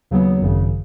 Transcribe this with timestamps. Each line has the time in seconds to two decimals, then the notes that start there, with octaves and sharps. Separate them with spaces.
0.11 D#2 C#3 F#3 B3
0.41 G#1 F#2 C#3